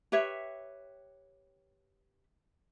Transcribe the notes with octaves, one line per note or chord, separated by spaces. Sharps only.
G4 B4 C#5 E5